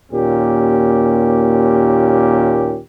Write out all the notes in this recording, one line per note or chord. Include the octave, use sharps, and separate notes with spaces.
D#2 A#2 C#4 G4